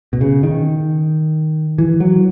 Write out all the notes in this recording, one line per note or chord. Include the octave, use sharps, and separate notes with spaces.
B2
C#3
D#3
E3
F#3